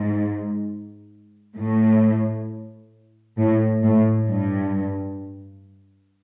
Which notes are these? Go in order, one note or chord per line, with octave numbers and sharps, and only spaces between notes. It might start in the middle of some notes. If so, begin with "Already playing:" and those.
Already playing: G#2
A2
A2
A2
G2